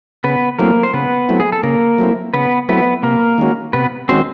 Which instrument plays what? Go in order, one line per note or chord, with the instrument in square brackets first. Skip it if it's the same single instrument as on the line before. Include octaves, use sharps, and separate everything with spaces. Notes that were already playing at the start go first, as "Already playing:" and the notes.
[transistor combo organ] C#3 [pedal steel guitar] B3 B4
[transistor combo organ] F#3 A3 C4 E4 [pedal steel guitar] A#3 A#4
[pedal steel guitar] C5
[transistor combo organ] C#3 [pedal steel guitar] B3 B4
[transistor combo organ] F#3 A3 C4 E4
[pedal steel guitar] G#4
A4
[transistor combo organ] C#3 [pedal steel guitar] A#3 A#4
[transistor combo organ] F#3 A3 C4 E4
[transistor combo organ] C#3 [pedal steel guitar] B3 B4
[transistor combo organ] F#3 A3 C4 E4 [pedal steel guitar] B3 B4
[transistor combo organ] C3 [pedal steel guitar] A#3 A#4
[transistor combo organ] D#3 G#3 C#4 F#4
[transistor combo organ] C3 [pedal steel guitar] B3 B4
[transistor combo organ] D#3 G#3 C#4 F#4 [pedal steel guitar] C4 C5